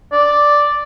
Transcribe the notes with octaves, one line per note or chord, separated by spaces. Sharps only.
D5